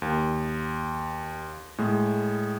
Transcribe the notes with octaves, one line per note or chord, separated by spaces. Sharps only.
D#2
A2 G#3